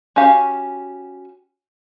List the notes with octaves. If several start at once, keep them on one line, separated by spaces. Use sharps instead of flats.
C#4 F#4 G4 F5